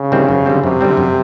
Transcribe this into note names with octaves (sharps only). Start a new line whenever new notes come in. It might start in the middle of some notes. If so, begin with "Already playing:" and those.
Already playing: C#3
D#3 G3 C4 E4
F#2
D3 G3 C4
F#2 C3
D3 G3 C4
F#2